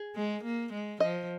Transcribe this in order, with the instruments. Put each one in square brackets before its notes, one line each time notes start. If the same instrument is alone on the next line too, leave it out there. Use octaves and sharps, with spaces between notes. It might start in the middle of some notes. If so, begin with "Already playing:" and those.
Already playing: [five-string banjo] G#4
[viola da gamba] G#3
A#3
G#3
[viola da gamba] F3 [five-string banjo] D#5